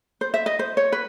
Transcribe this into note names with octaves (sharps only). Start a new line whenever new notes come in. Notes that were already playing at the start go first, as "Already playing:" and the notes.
C5
E5
D#5
C5
C#5
B4